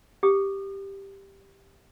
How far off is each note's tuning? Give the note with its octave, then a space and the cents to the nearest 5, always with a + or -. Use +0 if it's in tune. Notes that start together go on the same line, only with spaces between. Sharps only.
G4 +0 D#6 -45